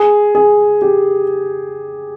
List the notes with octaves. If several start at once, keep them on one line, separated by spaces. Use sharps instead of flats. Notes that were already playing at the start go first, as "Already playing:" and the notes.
Already playing: G#4
G#4
G4